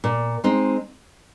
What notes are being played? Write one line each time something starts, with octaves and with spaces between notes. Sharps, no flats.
A#2
G#3 C4 D#4